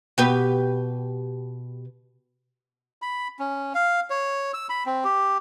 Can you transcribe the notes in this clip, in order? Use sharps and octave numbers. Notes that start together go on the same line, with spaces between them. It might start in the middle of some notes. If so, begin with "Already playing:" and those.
B2 G4 B4
B5
C#4
F5
C#5
E6
B5
C4
G4